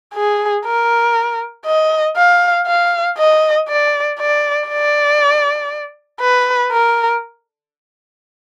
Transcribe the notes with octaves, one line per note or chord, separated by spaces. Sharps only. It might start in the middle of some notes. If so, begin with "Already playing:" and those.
G#4
A#4
D#5
F5
F5
D#5
D5
D5
D5
B4
A#4